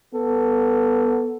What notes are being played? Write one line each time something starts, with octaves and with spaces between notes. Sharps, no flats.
B3 A4